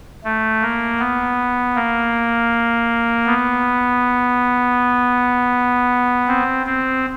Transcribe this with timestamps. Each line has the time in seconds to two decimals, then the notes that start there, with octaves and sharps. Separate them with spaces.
0.24 A3
0.62 A#3
1.00 B3
1.75 A#3
3.26 B3
6.28 C4
6.66 C4